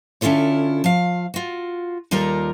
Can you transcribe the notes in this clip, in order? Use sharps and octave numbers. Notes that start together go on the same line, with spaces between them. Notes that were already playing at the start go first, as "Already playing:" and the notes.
D3 C#4 E4 F4 A4 C#5
F3 F5
F4 F#4
D#2 G3 F4 A4 A#4 A#5